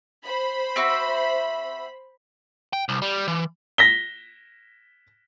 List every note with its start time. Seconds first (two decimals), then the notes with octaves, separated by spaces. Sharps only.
0.25 C5 B5
0.76 C4 F#4 E5
2.73 G5
2.89 C2
3.02 G3
3.28 E3
3.78 A#6 B6 G7